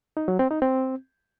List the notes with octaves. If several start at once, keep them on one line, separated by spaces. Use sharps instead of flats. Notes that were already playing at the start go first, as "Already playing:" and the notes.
D#4
F#3
C4
D#4
C4